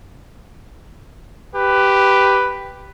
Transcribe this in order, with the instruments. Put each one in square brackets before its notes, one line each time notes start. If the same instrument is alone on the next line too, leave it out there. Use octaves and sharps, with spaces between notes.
[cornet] G4 [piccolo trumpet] B4